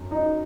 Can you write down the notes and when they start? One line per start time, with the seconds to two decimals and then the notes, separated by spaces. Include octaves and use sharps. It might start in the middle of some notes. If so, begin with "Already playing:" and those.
Already playing: F#2
0.11 D#4